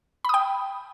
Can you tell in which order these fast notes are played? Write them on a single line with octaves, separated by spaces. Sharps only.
B5 D#6 G5